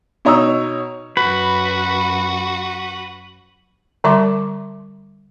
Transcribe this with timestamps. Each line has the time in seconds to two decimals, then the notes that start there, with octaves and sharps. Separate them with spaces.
0.25 B2 D#4 C#5 A#5 D#6 E6
1.17 F#2 F#4 B4
4.04 D3 G3 E5 A5 C6 D6